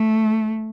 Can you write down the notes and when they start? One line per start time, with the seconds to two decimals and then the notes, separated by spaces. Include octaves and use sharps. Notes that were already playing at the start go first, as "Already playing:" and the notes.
Already playing: A3